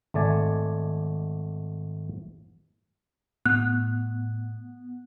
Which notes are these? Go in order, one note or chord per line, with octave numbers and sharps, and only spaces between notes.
G#1 A3 D5 G#5
A2 B3 F#6